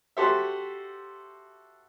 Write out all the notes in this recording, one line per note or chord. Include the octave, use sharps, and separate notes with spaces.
F#4 G4 A4 C5 E5